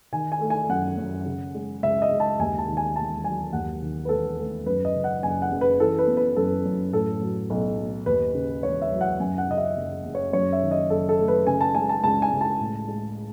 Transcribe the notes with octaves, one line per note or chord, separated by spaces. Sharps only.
D#3 G#5
G#5
A3
G#5
F#2 F#5
F#2
C#3
G#3
C#2 E5
D#5
C#2
A5
D#2 G#5
A5
D#3
G#5
E1 A5
F#3 G#5
D#2 F#5
D#3
B4
E1 A4
A3
F#2 B4
D#5
C#3
F#5
F#1 G#5
F#5
F#1
B4
E3 A4
B4
B3
B4
F#2 A4
F#2
A2 A4
F#3
B1
B3
D#2 B4
C#3
E1 C#5
E5
F#3
F#5
F#2 G#5
F#5
C#3 D#5
E5
F#1
F#1
C#5
F#2 C#5
E5
D#3
D#5
F#1 A4
A4
A3
B4
C#3 G#5
A5
G#3 G#5
A5
C#2 A5
G#5
C#2
A5
A2
G#3